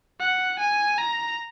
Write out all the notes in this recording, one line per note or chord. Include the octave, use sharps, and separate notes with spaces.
F#5
G#5
A#5